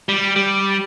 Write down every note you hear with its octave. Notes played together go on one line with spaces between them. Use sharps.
G3
G3